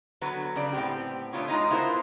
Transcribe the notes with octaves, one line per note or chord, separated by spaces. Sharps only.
D3 F#3 B3 B4
C#3 D5
A2 B3 C4 G4
A3 B3 C4 D4 F4 C#5
G#3 A3 D#4 F4 D#5
B3 E4 F4 A#4 C5